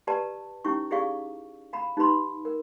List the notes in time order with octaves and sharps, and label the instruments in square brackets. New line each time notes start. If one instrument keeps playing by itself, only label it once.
[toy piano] G4 B4 D5 A5 A#5
C#4 D#4 E4 G4 C#6
E4 G4 G#4 D5 F5 C#6
F5 A#5 B5
D#4 G4 B4 B5 C6
A#4